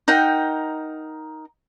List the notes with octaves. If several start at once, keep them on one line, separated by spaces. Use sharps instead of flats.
D#4 A#4 F#5 G5